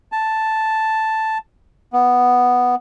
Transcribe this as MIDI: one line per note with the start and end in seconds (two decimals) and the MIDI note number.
0.12 1.38 81
1.93 2.75 59